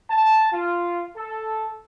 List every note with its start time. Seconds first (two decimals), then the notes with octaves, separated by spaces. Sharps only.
0.10 A5
0.52 F4
1.16 A4